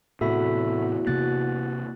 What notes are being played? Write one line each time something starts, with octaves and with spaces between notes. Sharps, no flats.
E2 A2 C3 F#4 A4 E5 B5
C3 A#3 F#6 A6